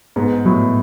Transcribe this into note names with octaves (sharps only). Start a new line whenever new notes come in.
G#2 B3
A2 F#3